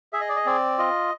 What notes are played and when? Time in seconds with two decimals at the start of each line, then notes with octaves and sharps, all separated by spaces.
0.13 G#4 E5
0.21 D#5
0.29 D5
0.36 D#5
0.46 C4 D5
0.78 F4 D#5